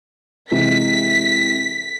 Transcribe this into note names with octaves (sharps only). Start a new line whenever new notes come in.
C3 E3 G#3 B6